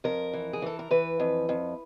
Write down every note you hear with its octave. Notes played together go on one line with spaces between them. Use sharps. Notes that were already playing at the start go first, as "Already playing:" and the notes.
F2 A#4
E3
G#4
E3 A4
A#4
E3 B4
F2
F2